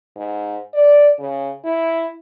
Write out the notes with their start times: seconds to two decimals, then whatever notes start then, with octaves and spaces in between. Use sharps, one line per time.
0.16 G#2
0.73 D5
1.19 C#3
1.64 E4